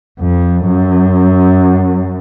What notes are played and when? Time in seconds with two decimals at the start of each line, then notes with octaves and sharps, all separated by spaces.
0.20 F2
0.65 F#2